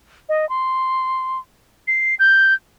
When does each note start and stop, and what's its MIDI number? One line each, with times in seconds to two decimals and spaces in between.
0.29 0.48 75
0.49 1.39 84
1.88 2.15 96
2.19 2.54 91